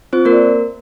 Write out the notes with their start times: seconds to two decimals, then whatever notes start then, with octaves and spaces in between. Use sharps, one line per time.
0.13 C4 F4 C5
0.25 A#3 A#4
0.32 D5